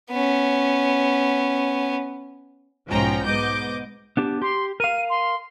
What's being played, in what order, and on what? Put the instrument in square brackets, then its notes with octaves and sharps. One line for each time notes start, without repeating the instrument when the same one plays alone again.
[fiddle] B3 C#4
[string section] B1 G#2 F3 C#4 G5 A#5
G#2 B3 D#5 D6 G6
[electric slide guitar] B3 D4 G4
[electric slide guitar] G4 [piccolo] C6
[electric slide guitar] A#4 F5 [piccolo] D#7
[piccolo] C6